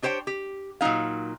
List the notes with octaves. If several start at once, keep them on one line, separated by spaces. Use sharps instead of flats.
D4 G4 C5 C#5 G5
G4
A#2 F#3 G#3 D#4 F5